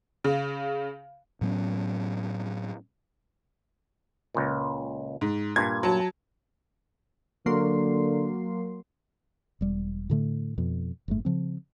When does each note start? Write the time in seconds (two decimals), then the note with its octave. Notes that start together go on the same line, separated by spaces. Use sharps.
0.24 C#3
1.41 A2 F#3 B3 C#4
4.35 C#2 A#2
5.21 G#2
5.56 G2 A#2 G#6
5.83 F#3 A5
7.46 D3 F#3 A#3 C6
9.61 E1 G3
10.10 A2 D3 A3
10.58 F2 B2
11.08 F#1 G#2 A3
11.25 C#3 F3 C4